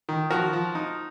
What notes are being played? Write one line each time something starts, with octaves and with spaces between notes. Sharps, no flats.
D#3
F3 F#4 A#4
F3
D#4